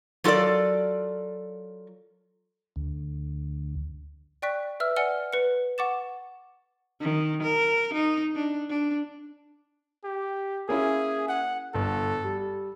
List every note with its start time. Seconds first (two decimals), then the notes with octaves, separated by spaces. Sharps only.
0.24 F#3 F4 A4 A#4 D5
2.76 D2
4.42 D5 G5 C#6 F#6 B6
4.80 B4 E5 E6 F6
4.96 D5 F#5 G#5 F6 C#7 G7
5.33 B4 C#7
5.78 F#5 C#6 D6 A6 E7
7.00 D#3
7.43 A#4
7.94 D#4
8.36 D4
8.70 D4
10.04 G4
10.69 A#3 C#4 E4 G#4
11.28 F#5
11.75 G1 A4
12.24 G3